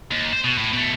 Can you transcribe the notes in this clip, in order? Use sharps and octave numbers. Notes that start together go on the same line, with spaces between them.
D#2
C5
B2
A2
B2 A3